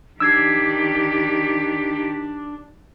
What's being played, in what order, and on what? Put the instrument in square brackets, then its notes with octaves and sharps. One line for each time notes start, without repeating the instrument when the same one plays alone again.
[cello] D#3 G4 [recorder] D4 [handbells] E6 G#6 C7